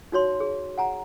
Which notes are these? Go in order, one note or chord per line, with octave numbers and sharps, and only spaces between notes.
D#4 F#4 C#5 C6
G#4
F#5 G#5 A#5